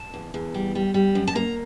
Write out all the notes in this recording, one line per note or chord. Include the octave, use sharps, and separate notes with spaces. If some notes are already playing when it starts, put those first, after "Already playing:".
Already playing: A5
E2
E2
G3
G3
G3
F#2
A5
A#3 A#5